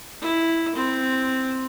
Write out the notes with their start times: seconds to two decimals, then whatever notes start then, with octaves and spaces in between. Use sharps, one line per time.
0.21 E4
0.75 C4